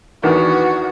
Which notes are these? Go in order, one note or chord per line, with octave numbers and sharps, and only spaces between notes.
E2 D#3 B3 D4 F#4